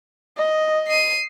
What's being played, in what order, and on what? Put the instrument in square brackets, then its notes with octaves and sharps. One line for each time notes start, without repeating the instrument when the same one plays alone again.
[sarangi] D#5
[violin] C7 D#7